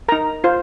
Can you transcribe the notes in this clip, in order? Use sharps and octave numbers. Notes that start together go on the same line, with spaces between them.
D#4 A#4 A#5
F4 C5